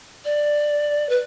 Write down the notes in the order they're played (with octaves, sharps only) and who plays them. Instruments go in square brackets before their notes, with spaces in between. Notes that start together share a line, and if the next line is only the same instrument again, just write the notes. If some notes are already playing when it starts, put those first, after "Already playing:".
[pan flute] D5
B4